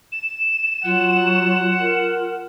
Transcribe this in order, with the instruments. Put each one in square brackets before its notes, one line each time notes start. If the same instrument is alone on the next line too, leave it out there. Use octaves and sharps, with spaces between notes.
[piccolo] E7
[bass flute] F#3 [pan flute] F4 [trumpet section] F#5
[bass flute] A#4